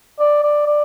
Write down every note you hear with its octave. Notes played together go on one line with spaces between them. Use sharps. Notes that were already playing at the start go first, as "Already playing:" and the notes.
D5
D5
D5